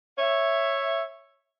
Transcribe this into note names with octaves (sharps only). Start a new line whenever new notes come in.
C#5 E5